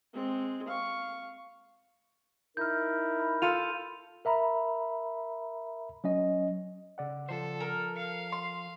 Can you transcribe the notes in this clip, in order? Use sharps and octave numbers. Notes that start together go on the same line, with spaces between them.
G#3 C4
F5 C#6
D#4 E4 A#4 F6 G6
B5
F4 A4 C6 D#7 F7
A#4 E5 A#5 B5
F#3 C#4 D#5
C#3 D5 F#5
F3 A4 C5
A#4
F5 C#7
C6